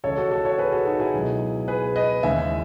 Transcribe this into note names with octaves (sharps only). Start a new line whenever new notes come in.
C#2 C#3 E3 A4 C#5
F#4 A4
F#4 A4
A4 C#5
G#4 B4
F#4 A4
D#4 F#4
E4 G#4
C#2 B2 F#3 B3
G#4 B4
B4 D#5
D#2 C#3 E3 G#3 E5 G#5